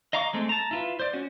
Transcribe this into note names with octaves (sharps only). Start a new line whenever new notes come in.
D#5 F5 A#5 C#6 D6
G#3 A3 C4
A5 A#5
E4 F4 B4
C5 D5
C#4 F#4